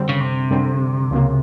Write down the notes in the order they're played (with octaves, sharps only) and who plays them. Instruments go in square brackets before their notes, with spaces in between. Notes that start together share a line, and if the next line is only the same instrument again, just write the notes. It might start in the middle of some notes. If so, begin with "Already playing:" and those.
Already playing: [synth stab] F#2 D3 G3 C4
[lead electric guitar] C#3
C3
[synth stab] F#2 D3 G3 C4
C#2 C#3 F#3 A#3